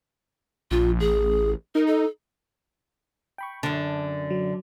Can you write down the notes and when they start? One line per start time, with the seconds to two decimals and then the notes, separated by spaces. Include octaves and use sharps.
0.71 A#1 F4
1.00 A1 G#4
1.75 D#4 A#4
1.87 A4
3.38 G5 B5 C#6
3.63 F#2 D3 A5
4.30 F#3